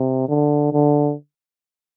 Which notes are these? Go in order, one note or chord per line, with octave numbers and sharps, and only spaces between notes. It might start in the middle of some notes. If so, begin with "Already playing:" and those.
Already playing: C3
D3
D3